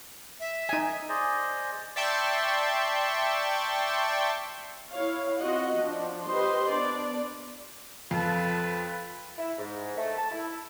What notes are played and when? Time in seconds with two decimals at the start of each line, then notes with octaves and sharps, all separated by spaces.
0.40 E5
0.69 D#4 G#5
1.09 G#4 C5 D5 D#5
1.96 D5 E5 G5 A5 C6 C#6
4.91 E4 C#5 F5
5.40 C4 F4 F#4 D#5 F#5
5.77 F3 D4
6.28 G4 B4 C5 D#5 C6
6.70 B3 D4 D5
8.11 F2 F4 A4 B4
9.38 E4
9.58 G#2
9.97 A3
10.17 A5
10.31 E4